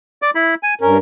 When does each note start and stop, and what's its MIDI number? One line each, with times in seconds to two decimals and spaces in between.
0.22 0.30 74
0.22 0.30 86
0.35 0.55 64
0.35 0.55 83
0.63 0.74 80
0.81 0.98 43
0.81 0.98 61
0.81 0.98 70